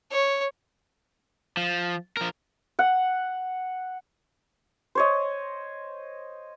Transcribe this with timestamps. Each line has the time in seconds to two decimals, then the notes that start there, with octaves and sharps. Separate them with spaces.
0.11 C#5
1.57 F3
2.17 F3 A#4
2.79 F#5
4.95 C5 C#5 D#5